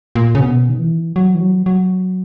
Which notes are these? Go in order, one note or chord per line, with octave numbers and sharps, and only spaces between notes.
A#2
C#3
B2
D#3
E3
F#3
E3
F#3
F#3